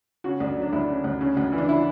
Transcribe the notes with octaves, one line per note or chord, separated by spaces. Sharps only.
C#3 F#4
D2
F#3
D4
D2 E4
C#3
D2
C#3
D2
E3
D4
E4